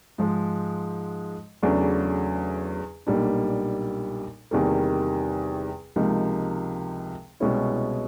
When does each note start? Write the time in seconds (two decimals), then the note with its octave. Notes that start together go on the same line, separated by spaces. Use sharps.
0.18 G#2 F3 G#3
1.62 E2 C#3 F#3 A3 D4
3.07 B1 A#2 G3 A#3 D4
4.51 E2 C3 D#3 G3 A#3
5.96 C#2 C3 F3 A#3 D#4
7.40 C2 B2 G#3 C#4 E4